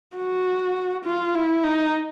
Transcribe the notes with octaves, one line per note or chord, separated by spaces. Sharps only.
F#4
F4
E4
D#4